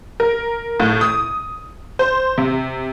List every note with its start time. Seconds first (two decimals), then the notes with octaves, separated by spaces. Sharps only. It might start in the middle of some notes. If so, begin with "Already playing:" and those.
0.20 A#4
0.80 A2
1.01 D#6
1.99 C5
2.38 C3